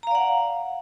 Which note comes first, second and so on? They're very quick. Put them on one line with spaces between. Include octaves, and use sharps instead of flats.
A#5 F5 D5 F#5